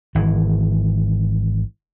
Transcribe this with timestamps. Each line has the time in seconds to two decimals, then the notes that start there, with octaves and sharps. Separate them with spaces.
0.15 G#1 E3